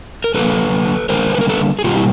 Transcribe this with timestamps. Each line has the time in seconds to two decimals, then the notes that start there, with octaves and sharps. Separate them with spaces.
0.24 A#4
0.34 D3 F#3 A#3 A4 B4
1.09 D3 G3 A#3 A#4 C5
1.35 B4
1.41 A#4
1.49 A4 B4
1.79 G#4
1.84 B2 G3 A#3 F4 G4
1.97 E4